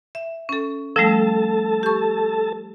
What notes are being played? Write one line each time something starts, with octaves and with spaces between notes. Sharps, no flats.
E5
C#4 A4
F3 G3 A3 A4 A5
G4 C#6